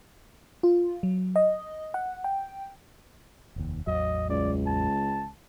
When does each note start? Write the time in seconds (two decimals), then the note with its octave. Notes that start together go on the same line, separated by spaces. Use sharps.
0.63 F4
1.03 F#3
1.36 D#5
1.94 F#5
2.24 G5
3.56 F1 D#2
3.87 A1 E2 F#3 D#5
4.30 C#2 D5
4.66 A5